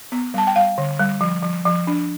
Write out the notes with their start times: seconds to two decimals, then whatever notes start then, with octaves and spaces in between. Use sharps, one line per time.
0.12 B3
0.34 G3 A5
0.47 G5
0.56 G3 F5
0.78 D3
1.00 G3
1.21 F3
1.43 F3
1.65 F3
1.87 D4